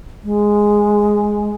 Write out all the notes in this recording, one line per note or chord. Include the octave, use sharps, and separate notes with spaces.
G#3